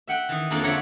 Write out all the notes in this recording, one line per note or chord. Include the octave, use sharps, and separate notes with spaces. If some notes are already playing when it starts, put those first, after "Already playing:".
E5 F#5 G5
D#3 E3
F2 F3 A#3 D4 F4 A4
D3 F4 C#5 E5 F#5 A#5